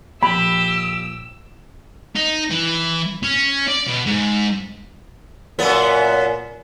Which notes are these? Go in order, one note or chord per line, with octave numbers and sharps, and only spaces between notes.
A#2 F3 G4 B5 E6
D#4
E3
C#4
D5
B2
G#2
F#2 A#2 B3